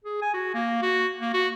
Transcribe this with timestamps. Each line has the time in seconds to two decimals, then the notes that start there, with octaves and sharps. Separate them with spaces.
0.04 G#4
0.22 G#5
0.34 F#4
0.54 A#3
0.82 F#4
1.21 A#3
1.34 F#4